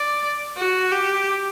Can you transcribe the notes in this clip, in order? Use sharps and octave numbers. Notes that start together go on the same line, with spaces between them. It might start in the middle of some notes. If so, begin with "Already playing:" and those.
Already playing: D5
F#4
G4